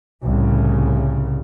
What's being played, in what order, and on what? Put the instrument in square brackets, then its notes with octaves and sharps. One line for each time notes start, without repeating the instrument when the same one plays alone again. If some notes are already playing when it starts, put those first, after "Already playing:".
[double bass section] C2 A2 C#3